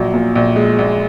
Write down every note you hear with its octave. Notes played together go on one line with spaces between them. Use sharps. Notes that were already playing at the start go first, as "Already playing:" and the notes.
Already playing: A#1 F#3
A#2
A#1
G#3
A#1